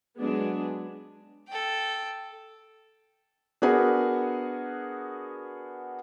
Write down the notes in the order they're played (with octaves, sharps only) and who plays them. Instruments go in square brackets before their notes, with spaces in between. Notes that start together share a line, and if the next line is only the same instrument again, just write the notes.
[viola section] F#3 G#3 B3 D4 G#4
[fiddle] A4 G5
[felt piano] B3 D4 F#4 G#4 A#4 B4